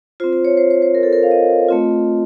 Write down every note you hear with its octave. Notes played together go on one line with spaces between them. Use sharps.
C4 F4 C5
C5
C#5
C5
C5
C5
A#4
A4
A#4
F5
D#5
A3 C4 F4